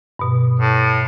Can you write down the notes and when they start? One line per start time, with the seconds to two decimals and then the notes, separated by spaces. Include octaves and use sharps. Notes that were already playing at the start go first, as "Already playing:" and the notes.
0.19 G2 B2
0.60 A2